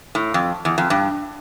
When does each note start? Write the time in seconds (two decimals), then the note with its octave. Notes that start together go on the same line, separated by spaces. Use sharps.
0.15 A2
0.34 F2
0.65 E2
0.78 F2
0.90 G2